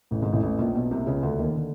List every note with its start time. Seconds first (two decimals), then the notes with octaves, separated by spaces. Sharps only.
0.11 A1 A2
0.21 G#1 G#2
0.32 A1 A2
0.43 A1 A2
0.59 A#1 A#2
0.75 B1 B2
0.91 C2 C3
1.07 C#2 C#3
1.23 D2 D3
1.39 D#2 D#3
1.56 D3